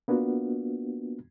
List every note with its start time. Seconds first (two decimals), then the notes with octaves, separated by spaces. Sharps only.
0.08 A#3 B3 D4 F4 F#4